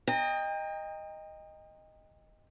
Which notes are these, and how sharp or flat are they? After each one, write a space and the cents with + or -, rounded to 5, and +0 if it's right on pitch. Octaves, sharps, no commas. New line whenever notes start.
D#5 +0 G5 +30 A#5 -30